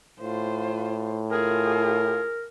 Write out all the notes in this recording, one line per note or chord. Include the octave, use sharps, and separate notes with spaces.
A2 F4 C5
F4 G#4 A#4